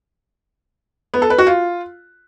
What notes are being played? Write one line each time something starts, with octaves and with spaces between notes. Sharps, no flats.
B3
A4
B4
F#4
F4